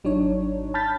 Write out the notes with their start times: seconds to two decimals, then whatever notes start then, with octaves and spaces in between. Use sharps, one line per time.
0.04 G#1 F#3 D4 D#4 C#5
0.74 A5 B5 F6 G6 A6 B6